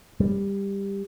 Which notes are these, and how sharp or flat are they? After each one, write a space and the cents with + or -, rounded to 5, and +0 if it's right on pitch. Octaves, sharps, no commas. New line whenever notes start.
G3 +15